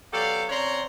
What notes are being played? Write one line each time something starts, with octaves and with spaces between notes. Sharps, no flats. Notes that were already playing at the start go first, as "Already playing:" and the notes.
F#3 B3 G4 A4 D5 F5
C#3 C4 C#5 D5 A#5 C6